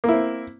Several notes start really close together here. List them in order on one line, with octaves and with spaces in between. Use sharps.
A#3 E4 C4